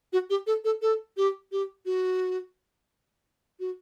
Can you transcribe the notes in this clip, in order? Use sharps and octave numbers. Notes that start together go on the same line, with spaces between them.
F#4
G4
A4
A4
A4
G4
G4
F#4
F#4